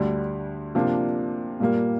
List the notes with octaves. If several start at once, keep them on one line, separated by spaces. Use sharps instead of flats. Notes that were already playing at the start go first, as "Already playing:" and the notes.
Already playing: D2 D3 G3
C3 F3 A#3 D4 F4
A#2 G3 A#3